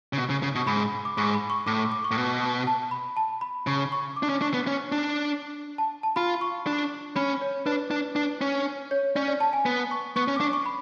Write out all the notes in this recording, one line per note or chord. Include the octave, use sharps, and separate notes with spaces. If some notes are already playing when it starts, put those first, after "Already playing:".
C#3
B2
C#3
C#3
B2 C#6
G#2 B5
B5
D6
G#2 C#6
B5
C#6
A2 D6
C#6
D6
C#6
A2
B2
A5
B5
A5
B5
C#3 C#6
C#6
D6
D4
C#4
D4 C#6
B3
C#4
D4
A5
A5
F4 B5
C#6
D4
C#4 B5
C#5
D4 B4
D4
D4
C#4
C#5
C#4 D5
D5
A5
G#5
B3
C#6
B3 C#6
C#4
D6
D4 C#6
C#6
B5